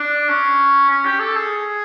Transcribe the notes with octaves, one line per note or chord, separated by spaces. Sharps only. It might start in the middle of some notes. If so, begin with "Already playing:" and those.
Already playing: D4
C#4
C#4
G4
A4
G#4